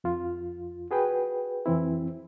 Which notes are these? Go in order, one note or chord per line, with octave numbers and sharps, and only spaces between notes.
F2 F4
F#4 G#4 B4 G5
F2 E3 C4 E4